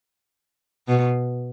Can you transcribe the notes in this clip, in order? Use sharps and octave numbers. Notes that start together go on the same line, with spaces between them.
B2